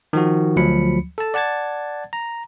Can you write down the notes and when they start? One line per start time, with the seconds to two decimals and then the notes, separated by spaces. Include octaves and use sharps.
0.13 D#3 F3 F#4
0.56 D2 F3 F#3 B5 C#7
1.18 A4 A5
1.34 D5 F#5 A5 G#6 A6
2.13 A#5